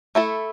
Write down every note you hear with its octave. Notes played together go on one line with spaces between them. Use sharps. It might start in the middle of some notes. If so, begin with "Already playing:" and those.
A3 E4 A4